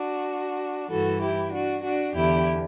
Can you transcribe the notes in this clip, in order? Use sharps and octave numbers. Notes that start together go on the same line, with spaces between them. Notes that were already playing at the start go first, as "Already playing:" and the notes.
Already playing: D4 F#4
G2 E3 F#4 A4
E4 G4
D4 F#4
D4 F#4
E2 D3 E4 G4